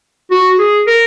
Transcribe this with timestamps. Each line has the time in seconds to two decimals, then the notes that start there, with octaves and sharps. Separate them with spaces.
0.31 F#4
0.59 G#4
0.87 A#4